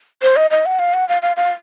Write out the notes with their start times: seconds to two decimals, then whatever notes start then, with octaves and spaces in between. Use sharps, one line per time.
0.23 C5
0.36 D#5
0.51 D#5
0.66 F#5
0.79 F5
0.94 F#5
1.09 F5
1.22 F5
1.37 F5